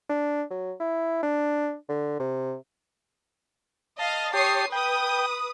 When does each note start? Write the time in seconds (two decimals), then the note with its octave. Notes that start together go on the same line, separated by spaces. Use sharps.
0.09 D4
0.50 F#3
0.80 E4
1.23 D4
1.89 D3
2.20 C3
3.99 D#5 F5 A5
4.34 G4 C#5 A5 D#6 C7
4.72 B4 G5 D#6